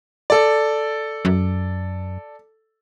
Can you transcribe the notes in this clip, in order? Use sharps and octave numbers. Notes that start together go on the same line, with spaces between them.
A4 D5
F#2